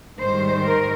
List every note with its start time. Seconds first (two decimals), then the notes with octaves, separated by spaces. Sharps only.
0.18 G#2 D#3 G3 C5
0.65 A#4